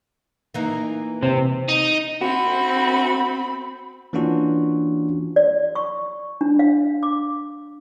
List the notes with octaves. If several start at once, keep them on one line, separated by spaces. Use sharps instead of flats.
E3 A#3 D#4
C3 C4
D#4
C4 F#4 B5
E3 A#3 C#4 D4 F4 F#4
D5
C#6
D4
F5
D6